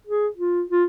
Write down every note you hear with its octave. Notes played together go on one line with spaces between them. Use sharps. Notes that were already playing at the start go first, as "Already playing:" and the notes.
G#4
F4
F4